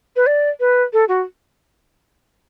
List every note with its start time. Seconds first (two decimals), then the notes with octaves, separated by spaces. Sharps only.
0.16 B4
0.26 D5
0.60 B4
0.93 A4
1.08 F#4